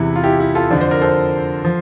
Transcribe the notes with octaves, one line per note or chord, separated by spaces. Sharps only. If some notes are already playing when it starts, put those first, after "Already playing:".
Already playing: E2 C3 E3 E4
F4
E4 G4
E4 G4
F4 A4
F2 D3 F3 D5
C5
A#4
A4 C5
F3